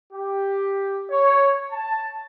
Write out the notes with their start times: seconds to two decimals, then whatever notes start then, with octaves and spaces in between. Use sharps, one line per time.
0.13 G4
1.10 C#5
1.72 A5